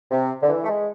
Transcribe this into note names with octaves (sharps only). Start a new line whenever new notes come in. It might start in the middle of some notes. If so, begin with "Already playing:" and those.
C3
D3
E3
A3
G#3